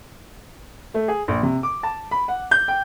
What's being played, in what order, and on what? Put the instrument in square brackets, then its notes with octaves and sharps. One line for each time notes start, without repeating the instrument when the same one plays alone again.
[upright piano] A3
G#4
A#1
C3
D6
A5
B5
F#5
G6
G5